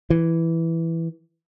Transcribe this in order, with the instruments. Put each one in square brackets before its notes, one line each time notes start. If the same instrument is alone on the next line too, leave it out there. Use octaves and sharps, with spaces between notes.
[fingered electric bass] E3